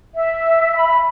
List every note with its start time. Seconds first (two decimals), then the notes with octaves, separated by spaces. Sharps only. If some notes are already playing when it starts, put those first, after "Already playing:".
0.15 E5
0.76 B5